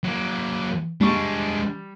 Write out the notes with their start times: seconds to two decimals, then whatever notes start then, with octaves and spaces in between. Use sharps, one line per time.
0.04 F#3 A#3
1.01 G3 G#3 D4 C#6